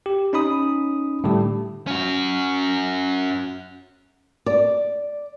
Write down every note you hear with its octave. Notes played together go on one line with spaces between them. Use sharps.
G4
C#4 D#4 B5 D#6
A2 D3 G3 G4
C#4 F#4
D5